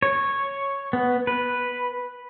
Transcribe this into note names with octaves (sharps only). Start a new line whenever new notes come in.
C#5
B3
B4